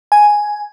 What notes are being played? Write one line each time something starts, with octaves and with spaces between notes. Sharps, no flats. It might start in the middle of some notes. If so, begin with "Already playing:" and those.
G#5